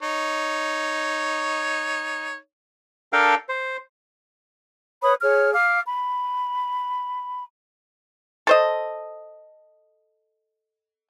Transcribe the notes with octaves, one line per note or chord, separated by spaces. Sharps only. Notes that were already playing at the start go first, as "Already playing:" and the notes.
D#4 C#5
D4 A4 A#4 F5 G5
C5
B4 C#5 B5 D#6
G#4 C#5 F6
F5 D6 F6
B5
A4 C5 D#5